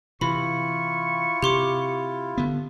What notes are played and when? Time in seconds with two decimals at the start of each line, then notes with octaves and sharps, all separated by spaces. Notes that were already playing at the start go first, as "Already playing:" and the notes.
0.21 C3 E3 E4 F4 B5 C#6
1.42 C3 G4 C6 D6
2.38 D3 B3